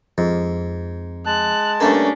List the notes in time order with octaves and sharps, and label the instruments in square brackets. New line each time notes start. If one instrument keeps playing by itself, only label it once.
[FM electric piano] F2 [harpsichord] G#2
[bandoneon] G#3 A5 [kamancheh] F#6
[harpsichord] G2 A3 A#3 [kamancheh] C#4 D4